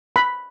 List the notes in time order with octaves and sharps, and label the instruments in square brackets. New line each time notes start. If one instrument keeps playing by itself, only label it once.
[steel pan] B5